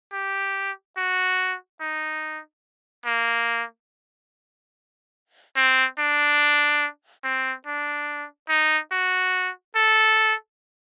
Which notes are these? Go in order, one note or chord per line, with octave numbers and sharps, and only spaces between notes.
G4
F#4
D#4
A#3
C4
D4
C4
D4
D#4
F#4
A4